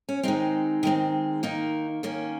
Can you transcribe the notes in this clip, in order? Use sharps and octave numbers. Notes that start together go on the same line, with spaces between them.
C#4
D#3 G#3 C4 D#4
D#3 G#3 C4
D#3 A#3 D#4
D#3 A#3 C#4